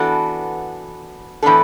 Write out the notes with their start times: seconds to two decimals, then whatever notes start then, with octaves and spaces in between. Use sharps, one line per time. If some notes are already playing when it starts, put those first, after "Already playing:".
Already playing: E3 B3 D4 F#4 A4
1.42 A2 E3 B3 D4 A4